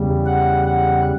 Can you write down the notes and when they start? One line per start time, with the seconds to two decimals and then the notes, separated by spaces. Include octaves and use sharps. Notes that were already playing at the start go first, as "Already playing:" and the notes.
Already playing: E2 C#3 G3
0.26 F#5
0.65 F#5